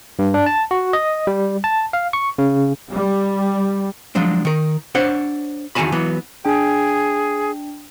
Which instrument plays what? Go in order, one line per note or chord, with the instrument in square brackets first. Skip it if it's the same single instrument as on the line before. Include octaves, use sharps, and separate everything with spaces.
[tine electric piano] G2
D4
A5
F#4
D#5
G3
A5
F5
C#6
C#3
[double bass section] G3
[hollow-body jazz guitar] F3 F#3 G#3 D4
D#3 A#4
D4 C5 C#5 F#5
E2 D#3 F#4 G#5 A5 B5
E3 F#3 B3
[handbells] D4 G5 [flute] G#4